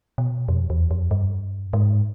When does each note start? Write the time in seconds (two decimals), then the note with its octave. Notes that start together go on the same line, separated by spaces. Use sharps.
0.18 B2
0.48 F2
0.70 E2
0.91 F2
1.11 G2
1.73 G#2